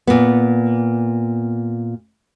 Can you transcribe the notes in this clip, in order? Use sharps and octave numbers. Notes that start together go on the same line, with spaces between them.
A#2 B3